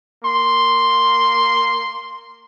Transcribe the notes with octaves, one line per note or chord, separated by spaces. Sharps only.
A#3 C6